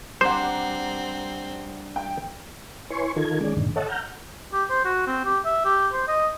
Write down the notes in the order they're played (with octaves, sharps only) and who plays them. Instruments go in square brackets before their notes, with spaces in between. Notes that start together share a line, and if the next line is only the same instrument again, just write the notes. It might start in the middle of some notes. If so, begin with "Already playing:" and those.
[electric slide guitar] G3 D4 [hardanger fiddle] C4 [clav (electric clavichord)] C5 [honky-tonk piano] F#5 A#5 D6
[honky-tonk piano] G5
[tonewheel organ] E4 B4 C#5 G#5 C6 C#6
D#3 D#4 F4 A4 A#4 G#6
D#3 G#3 C#4 G#4 D5
G2 A#2 D3 D#3
A4 C#5 D#5 E5 F#5 A5
F#5 A#5 F6 G6
[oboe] G4
C5
F#4
C4
G4
E5
G4
C5
D#5